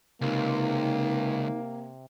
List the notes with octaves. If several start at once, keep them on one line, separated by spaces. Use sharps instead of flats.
C#2 C3 A#3 D#4